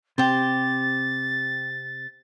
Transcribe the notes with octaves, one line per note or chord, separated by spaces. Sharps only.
C3 C4 G4 C5 A6